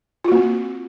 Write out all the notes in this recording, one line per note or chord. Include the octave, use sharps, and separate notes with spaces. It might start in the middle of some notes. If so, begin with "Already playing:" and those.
A#3 C4 F4 F#4